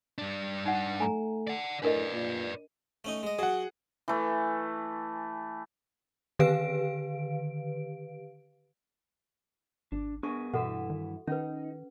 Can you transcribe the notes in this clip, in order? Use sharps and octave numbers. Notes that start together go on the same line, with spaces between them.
G2 D4
D#4 F#5
A3 G#5 A#5
D5 F#5
A2 D4 A#4 B4 D5 D#5
A#2
A3 C#4 D#4
G#3 D#5
F#3 G#4 F#5
E3 A3
D3 D#3 G4 B4 F5 D7
G#1 D4
B3 D4 G#4 A#4 C#6
G2 B2 E3 E4 F#4 A4 F#5
D#3
D#3 C#4 D#4 B4